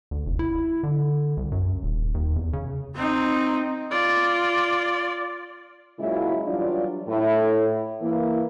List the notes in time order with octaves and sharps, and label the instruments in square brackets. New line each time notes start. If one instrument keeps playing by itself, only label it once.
[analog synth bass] D2
F1
E4
D3
C2
F#2
D#1
D#2
E2
C#3
[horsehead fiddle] C4 D#4
[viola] F4 D5
[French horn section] A#2 C#3 F#3 G#3 E4
E3 F#3 G3 D4 F4
A2 E4
E3 A#3 E4